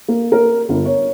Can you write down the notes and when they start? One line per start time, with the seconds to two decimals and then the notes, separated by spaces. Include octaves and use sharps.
0.08 A#3
0.32 A#4
0.69 G1
0.85 C#5